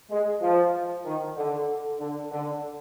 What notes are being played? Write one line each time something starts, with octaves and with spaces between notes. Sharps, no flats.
G#3
F3
D#3
D3
D3
D3